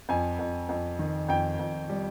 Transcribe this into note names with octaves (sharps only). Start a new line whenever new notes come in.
F2 G#5
F2
F2
D#3
F2 G5
F2
G3